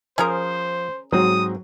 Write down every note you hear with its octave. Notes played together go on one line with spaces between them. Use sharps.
F3 C#4 G#4 A#4 C5 G#5
G#2 F#3 C4 D#6